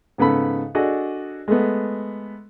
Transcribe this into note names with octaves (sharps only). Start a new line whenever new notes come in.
G#2 C#3 B3 A4 B5
D4 F#4 G#4 A4 D#5
G#3 A3 B3